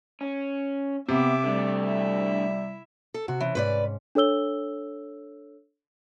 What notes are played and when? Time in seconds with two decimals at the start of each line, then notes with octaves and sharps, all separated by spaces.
0.21 C#4
1.09 C3 B3 E5 D6
1.44 D3 G3 A3
1.83 E4 E5
3.14 A4
3.28 C3 F#4
3.40 E3 C#4
3.55 G#2 B4 C5 D5
4.15 D4 A4 C#5 E6 G7